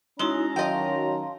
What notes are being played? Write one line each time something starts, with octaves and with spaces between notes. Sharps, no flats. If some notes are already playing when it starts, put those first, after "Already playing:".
G#3 C#4 D#4 E4 F#4 A#5
D#3 F#3 D#5 F5 G5 A5 C6